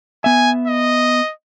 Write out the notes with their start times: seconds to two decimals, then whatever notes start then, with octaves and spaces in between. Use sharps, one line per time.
0.24 B3 E5 G#5
0.67 D#5